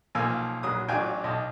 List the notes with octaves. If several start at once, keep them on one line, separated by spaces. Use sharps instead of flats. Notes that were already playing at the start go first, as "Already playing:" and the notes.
B1 F3 A#3 G#5 E6
A#1 F#3 D#6
A1 F#3 D4 F4 G5 G#5
B1 D#5 A5